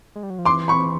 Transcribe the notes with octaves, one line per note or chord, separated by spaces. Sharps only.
G#3
G3
F#3
F3
E3 C6 D6
B5 C#6